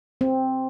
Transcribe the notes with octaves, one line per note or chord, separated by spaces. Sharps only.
C4